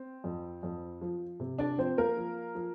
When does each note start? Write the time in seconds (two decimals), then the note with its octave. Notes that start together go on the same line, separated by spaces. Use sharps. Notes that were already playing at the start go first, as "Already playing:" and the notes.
Already playing: C4
0.24 F2
0.63 F2
1.01 F3
1.40 C3
1.58 D4 D5
1.78 F3 C4 C5
1.98 A#3 A#4
2.17 F3
2.55 F3